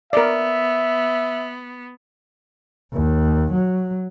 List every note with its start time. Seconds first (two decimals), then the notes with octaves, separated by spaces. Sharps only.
0.13 B3 A#4 D5 E5
2.93 D#2
3.53 F#3